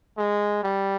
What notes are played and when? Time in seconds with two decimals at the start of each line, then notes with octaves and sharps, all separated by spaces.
0.18 G#3
0.63 G3